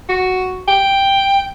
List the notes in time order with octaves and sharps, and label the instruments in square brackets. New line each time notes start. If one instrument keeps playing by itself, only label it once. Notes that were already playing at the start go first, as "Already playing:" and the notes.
[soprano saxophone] F#4
G5